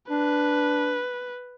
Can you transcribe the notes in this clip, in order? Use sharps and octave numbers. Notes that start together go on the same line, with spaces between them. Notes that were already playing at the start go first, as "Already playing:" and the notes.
D4 B4